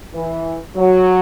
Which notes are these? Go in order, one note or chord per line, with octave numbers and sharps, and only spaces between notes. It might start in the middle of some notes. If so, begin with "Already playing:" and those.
E3
F#3